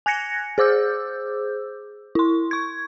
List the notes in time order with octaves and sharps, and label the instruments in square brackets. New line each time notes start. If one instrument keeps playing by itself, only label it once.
[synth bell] G#5 F#6 G#6 A#6 C#7
G#4 C5 D6 E6 G6
E4 C6
C#6 G#6